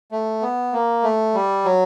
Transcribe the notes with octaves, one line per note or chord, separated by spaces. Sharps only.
A3
B3
A#3
A3
G3
F#3